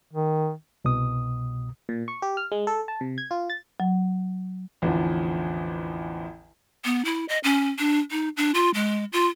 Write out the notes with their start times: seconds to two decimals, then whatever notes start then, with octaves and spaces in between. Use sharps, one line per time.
0.13 D#3
0.84 C2 B2 D#6
1.89 A#2
2.08 C#6
2.22 G4
2.37 F6
2.52 G#3
2.67 A4
2.88 A5
3.01 C3
3.18 G#6
3.31 F4
3.50 A6
3.80 F#3
4.82 A1 E2 D3 F3
6.85 B3
7.05 E4
7.29 D#5
7.44 C#4
7.79 D4
8.11 D#4
8.37 D4
8.54 F4
8.74 G#3
9.13 F4